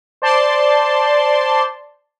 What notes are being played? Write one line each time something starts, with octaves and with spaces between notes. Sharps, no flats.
C5 D5 A5 C6